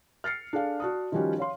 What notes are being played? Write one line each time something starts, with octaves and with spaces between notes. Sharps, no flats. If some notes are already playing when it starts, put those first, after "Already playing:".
F6 A6 C7 C#7
D4 G#4 A4 F5
F#4 D5 A5 D#6
D#3 F3 G3 C#4 F#4 G4
C#5 F5 C6